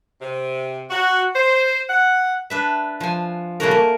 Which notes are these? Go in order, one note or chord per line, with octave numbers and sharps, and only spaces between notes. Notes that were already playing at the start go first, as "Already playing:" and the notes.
C3
F#4
C5
F#5
D4 B4 E5
F3 G#5
C#3 G3 A3 A#3 F#4 A#4
A#3